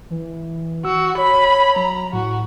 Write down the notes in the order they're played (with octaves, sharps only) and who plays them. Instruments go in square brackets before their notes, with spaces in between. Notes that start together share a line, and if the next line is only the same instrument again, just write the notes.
[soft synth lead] E3
[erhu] F#4 [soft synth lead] E6
[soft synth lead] C#5 [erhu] B5
[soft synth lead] F#3 [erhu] A#5
[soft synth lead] A2 [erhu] F#4